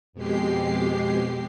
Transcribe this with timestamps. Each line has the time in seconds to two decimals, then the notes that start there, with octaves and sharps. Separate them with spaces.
0.13 F2 B2 G#3 G4 C7